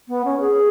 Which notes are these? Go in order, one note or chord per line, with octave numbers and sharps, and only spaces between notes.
B3
C#4
G#4